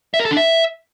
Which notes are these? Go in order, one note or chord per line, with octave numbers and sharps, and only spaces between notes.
E5
A#4
A4
D4
E5